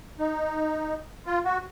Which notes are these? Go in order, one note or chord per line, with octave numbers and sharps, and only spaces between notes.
D#4
F4
F#4